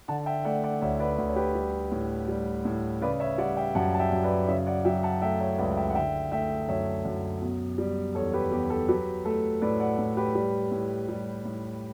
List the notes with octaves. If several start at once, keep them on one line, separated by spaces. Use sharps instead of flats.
D3 F#5 A5
E5 G5
A3 D5 F#5
D5 F#5
D2 C#5 E5
B4 D5
D2
C#5
G4 B4
G3
A2
G3
A2
C#3 B4 D5
C#5 E5
G3 D5 F#5
E5 G5
F#2 F#5 A5
A5
E5 G5
F#2
B4 D5
C#3 C#5 E5
D5 F#5
F#3 E5 G5
F#5 A5
A3 E5 G5
C#5 E5
C#2 B4 D5
E5 G5
F#5
D3 E5 G5
A3 E5 G5
F#2 C#5 E5
F#2
B2
G3
E2 A4 C#5
G4 B4
E2 G4
A4
F#3 G4 B4
A3 A4
A2 B4 D5
D5 F#5
A2
G4 B4
G3
A2
G3
A2